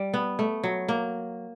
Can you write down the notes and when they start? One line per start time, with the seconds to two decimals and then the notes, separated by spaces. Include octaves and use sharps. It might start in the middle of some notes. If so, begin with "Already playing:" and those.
Already playing: G3
0.14 B3
0.39 A3
0.64 F#3
0.88 A#3